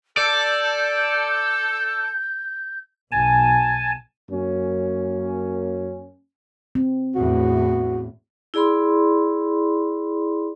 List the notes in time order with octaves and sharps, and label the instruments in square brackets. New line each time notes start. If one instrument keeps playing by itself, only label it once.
[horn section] A4 [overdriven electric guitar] D5 [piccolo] G6
[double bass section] B1 [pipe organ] G#5 A5
[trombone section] F#2 A#3 C#4
[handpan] C4
[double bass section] E2 A2 [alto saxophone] F#4
[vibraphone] E4 G#4 D5 B5 C6